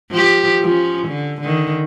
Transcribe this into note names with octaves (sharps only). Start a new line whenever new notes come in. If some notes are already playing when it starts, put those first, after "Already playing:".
F3 G4
F3 C#4
D3
D3 D#3